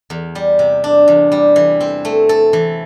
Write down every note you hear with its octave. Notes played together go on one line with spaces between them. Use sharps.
E2
G3
C3
D4
E2
G3
E3
C4
A3
A4
E3